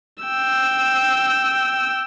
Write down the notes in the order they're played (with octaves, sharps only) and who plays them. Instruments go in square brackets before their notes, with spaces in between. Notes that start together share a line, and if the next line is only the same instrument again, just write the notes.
[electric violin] G5 E6